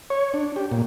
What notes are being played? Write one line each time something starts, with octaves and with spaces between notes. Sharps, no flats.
C#5
D4
G4
A#2